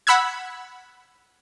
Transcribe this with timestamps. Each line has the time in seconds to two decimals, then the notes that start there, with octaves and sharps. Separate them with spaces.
0.07 F#5 B5 E6 F#6 G#6